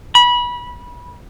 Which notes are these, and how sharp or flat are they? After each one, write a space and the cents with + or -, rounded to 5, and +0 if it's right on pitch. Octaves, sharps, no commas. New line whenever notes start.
B5 -25